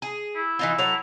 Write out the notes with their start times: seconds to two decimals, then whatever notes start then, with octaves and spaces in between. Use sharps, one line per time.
0.02 G#4
0.35 E4
0.59 E3 D#4 F4
0.78 F#3 A4 C#5 F7